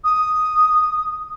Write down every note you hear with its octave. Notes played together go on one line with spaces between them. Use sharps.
D#6